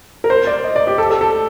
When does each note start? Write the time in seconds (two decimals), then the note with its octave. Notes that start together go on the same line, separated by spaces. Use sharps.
0.24 A#4
0.30 C5
0.47 D5
0.64 D#5
0.76 D5
0.87 G4
0.98 A4
1.10 A4
1.21 A4